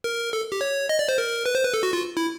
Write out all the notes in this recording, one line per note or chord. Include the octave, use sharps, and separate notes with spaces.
A#4
A4
G4
C#5
D#5
D5
C5
A#4
B4
C5
B4
A4
F#4
F4
E4